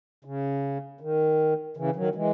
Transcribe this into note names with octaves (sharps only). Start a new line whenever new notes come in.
C#3
D#3
C#3 E3
D#3 F#3
E3 G#3